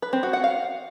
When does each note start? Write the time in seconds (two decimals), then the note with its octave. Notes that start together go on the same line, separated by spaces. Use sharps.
0.02 B4
0.13 C4
0.23 F#4
0.33 F#5
0.44 F5